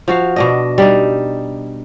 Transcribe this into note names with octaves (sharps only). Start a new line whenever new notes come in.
F3 F#4 F5
B2 D4 D#5
G3 D4 D#4